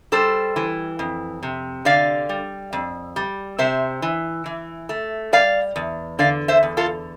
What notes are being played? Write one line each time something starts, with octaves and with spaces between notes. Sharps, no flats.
G3 A4 C5
E3
F2
C3
D3 D5 F5
G3
F2
G3
C3 C5 E5
E3
E3
A3
G3 D5 F5
E2
D3 D5 F5
C5 E5
E2
F4 A4